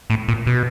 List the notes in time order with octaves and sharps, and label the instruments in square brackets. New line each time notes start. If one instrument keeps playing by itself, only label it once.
[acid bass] A2
A#2
B2